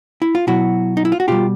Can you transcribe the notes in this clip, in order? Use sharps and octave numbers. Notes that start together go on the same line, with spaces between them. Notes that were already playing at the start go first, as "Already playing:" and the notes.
E4
F4
B2 F#3 E4 F#4
D#4
E4
F4
F#4
B2 G3 F4 G4